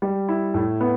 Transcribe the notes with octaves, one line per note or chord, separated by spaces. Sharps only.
G3
E4
A2
B3